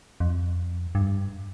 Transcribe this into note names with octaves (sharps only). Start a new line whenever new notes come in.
F2
G2